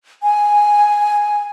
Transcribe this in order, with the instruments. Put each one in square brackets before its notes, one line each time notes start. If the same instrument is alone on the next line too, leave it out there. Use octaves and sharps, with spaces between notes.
[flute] G#5